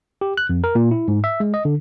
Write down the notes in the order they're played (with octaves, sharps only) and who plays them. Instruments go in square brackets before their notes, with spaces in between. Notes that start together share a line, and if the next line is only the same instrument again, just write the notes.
[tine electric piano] G4
F#6
F2
A#4
A#2
E4
G#2
E5
G#3
D#5
D3